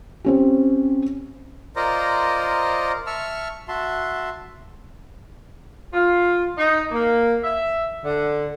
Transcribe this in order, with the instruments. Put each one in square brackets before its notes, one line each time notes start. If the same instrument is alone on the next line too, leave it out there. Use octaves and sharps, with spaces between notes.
[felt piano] C4 C#4 G4
[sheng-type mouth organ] F4 A#4 C5 D5 D#5 A#5
E5 A5 C#6 E6 F6
F#4 E5 A5 C6
[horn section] F4
D#4
A#3
E5
D3